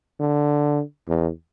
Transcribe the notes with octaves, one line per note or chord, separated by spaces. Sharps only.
D3
E2